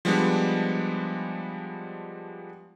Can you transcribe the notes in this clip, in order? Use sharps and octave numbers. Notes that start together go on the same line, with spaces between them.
F3 G3 G#3 B3 D4